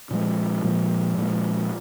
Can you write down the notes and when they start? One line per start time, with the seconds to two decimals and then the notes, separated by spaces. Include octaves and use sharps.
0.11 A#2 F3 G#3
0.64 A#2 F3 G#3
1.18 A#2 F3 G#3